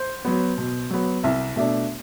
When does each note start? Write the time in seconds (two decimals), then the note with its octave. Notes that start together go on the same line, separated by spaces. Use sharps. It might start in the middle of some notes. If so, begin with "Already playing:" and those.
Already playing: C5
0.25 F#3 B3
0.58 B2
0.90 F#3 B3
1.24 C2 E5
1.56 B2 A3 D4 E5